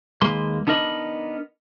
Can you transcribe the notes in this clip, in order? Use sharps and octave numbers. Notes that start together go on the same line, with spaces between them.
D#2 G#3 A#3 B4 C6
B3 D4 D#4 A#4 D#5 B5